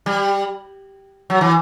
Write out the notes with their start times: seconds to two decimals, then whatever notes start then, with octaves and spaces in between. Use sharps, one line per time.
0.06 G3
1.30 F#3
1.41 E3